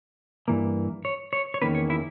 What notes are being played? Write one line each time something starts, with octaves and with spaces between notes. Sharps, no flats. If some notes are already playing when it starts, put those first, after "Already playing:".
G2 E3 A#3
C#5
C#5
C#5
E2 D#3 A#3 C#4 B4
C#5
E4